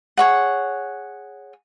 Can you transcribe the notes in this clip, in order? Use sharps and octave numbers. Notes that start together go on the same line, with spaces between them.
G#4 C#5 F#5